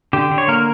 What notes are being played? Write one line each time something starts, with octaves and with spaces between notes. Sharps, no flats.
D3 G4
D3
C#5
A#3 A#4